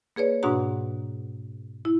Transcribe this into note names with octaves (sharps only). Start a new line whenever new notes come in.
A#3 G#4 B4 C#5 D5
G#2 B2 D4 F#4 F#5 A#5
E4